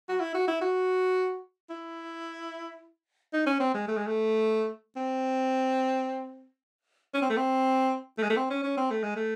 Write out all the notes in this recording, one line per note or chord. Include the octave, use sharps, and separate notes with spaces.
F#4
E4
F#4
E4
F#4
E4
D#4
C#4
C4
G#3
A3
G#3
A3
C4
C#4
C4
A3
C4
A3
G#3
A3
C4
C#4
C#4
C4
A3
G#3
A3